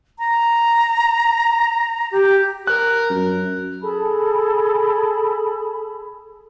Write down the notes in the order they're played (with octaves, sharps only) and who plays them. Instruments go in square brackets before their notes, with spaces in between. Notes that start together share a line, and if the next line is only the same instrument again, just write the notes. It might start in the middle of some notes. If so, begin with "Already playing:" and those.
[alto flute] A#5
G4
[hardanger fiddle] A#4 [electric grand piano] F#6
[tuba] F#2
[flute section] G#4 A4 A5 B5